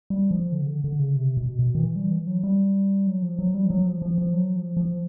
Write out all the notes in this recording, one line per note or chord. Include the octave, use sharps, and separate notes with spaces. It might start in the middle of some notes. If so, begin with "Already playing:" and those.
G3
F3
D3
C#3
D3
D3
C#3
C3
B2
B2
D#3
E3
G3
E3
F#3
G3
F#3
F3
F#3
G3
F3
F#3
F3
F3
F3
F#3
F3
F3